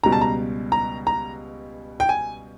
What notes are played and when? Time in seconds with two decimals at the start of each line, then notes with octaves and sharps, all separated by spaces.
0.03 C#2 B2 G3 A#5
0.12 A5
0.21 A#5
0.72 A#5
1.07 A#5
2.00 G5
2.09 G#5